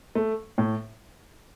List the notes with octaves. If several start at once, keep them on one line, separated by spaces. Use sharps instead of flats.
A3
A2